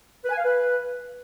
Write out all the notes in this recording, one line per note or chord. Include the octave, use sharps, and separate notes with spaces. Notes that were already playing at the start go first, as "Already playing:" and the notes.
B4
G#5
F5
B4